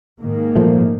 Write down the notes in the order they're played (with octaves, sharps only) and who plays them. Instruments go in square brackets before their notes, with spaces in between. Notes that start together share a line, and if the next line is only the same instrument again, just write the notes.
[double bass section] G#2 D#3 A#3
[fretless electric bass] A#2 F3 A3